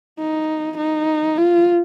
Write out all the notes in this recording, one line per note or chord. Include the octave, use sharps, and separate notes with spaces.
D#4
D#4
F4